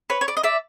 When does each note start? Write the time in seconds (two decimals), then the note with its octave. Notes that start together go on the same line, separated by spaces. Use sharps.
0.10 B4 C#5
0.21 C#5
0.28 D5
0.37 D#5
0.43 D5 E5